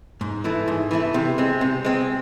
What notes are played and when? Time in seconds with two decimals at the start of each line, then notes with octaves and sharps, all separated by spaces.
0.21 G#2
0.44 E3 A3 E4
0.68 G#2
0.91 E3 A3 E4
1.14 C3
1.38 G#3 C4
1.61 C3
1.85 G#3 C4